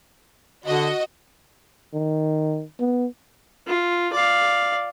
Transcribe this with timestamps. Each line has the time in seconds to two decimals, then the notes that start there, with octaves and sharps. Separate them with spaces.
0.66 D3 F#4 D#5
1.94 D#3
2.80 B3
3.67 F4
4.13 D5 F5